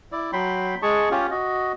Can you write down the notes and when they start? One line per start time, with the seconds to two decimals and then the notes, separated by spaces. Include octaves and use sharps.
0.12 E4 D5
0.33 F#3 G5 B5 C6
0.82 G#3 G#4 A5 C#6
1.11 C#4 F4 G4
1.31 F#4 D#5